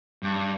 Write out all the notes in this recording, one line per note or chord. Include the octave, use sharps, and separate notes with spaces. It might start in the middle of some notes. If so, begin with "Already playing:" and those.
G2